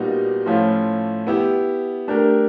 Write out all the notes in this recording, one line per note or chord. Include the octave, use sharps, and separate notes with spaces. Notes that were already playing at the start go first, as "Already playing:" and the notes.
Already playing: A#2 G3 B3 D#4 F#4
A2 F3 A3 C#4 F4
B3 E4 G4
A3 D4 G4 A#4